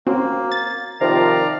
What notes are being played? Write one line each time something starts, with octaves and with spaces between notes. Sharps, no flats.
A#3 C4 C#4 F#4
A6
C3 D#3 F3 D5 F5 A#5